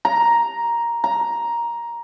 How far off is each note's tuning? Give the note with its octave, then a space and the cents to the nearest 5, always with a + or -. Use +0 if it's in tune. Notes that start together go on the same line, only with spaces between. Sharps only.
A#5 +5
A#5 +10